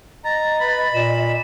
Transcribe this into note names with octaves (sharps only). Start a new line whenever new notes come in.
D#5 A#5 A6
B4 B5
A#2 E7